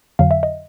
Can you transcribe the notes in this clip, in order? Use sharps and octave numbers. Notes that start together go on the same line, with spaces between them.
F2 D3 F#3 F5
E5
D#5